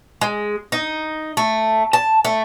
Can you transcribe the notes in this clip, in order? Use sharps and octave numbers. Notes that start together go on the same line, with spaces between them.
G#3
D#4
A3
A5
A3